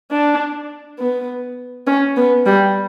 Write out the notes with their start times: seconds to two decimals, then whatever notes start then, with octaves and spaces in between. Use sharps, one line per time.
0.11 D4
0.99 B3
1.87 C#4
2.16 B3
2.46 G3